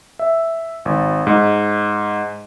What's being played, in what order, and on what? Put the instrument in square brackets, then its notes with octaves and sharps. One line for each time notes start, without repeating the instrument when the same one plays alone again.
[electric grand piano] E5
G#1
G#2